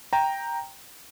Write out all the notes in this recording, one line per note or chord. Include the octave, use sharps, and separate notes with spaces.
G5 A#5